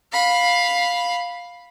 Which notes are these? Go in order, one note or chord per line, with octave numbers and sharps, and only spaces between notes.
F5 B5